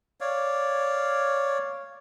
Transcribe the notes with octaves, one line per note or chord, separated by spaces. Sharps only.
C#5 D5 F5